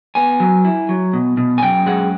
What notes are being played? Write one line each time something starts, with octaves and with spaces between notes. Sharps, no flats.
B3 G#5
F#3
E4
F#3
B2
B2
G#5
F#2 G5
G#3 F#5